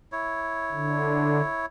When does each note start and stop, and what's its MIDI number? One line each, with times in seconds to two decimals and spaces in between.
0.12 1.66 64
0.12 1.66 73
0.71 1.41 50